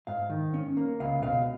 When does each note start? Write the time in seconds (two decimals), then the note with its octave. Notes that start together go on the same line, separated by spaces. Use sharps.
0.07 G#2 F5
0.30 D#3
0.54 C#4
0.77 A#3
1.00 C#2 F5
1.22 B2 F5